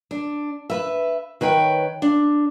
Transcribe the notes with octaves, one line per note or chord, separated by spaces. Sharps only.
D4
B4 E5
D#3 B4 C#5 G5
D4